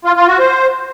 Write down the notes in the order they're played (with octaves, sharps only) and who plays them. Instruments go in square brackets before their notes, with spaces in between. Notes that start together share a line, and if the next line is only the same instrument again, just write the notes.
[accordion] F4
F4
F#4
C5